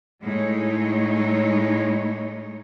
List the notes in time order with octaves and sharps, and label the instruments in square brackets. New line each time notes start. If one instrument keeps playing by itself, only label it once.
[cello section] A2 G#3 D#4 C#5